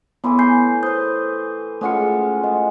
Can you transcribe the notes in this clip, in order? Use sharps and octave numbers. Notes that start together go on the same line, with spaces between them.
A2 E3 B3 B5 C6
G#5 G6 C7
B4 C5 D#6 G6
G#3 A3 C#4 F4 F#5 C#7
A3 D#5 F#5